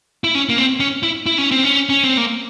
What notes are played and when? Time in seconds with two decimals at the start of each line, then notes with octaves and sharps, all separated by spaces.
0.24 E4
0.35 C#4
0.49 A#3
0.58 C4
0.80 C#4
1.03 E4
1.26 E4
1.38 C#4
1.51 C4
1.64 C#4
1.89 C#4
2.04 C4
2.17 A#3